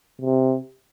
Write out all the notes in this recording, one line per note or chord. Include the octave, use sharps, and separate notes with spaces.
C3